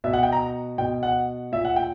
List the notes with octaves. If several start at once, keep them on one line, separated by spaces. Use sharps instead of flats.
B2 E5
F#5
G5
A#5
B2 G5
F#5
A#2 E5
F#5
G5